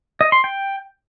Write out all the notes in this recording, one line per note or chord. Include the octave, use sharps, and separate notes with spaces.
D#5
C6
G5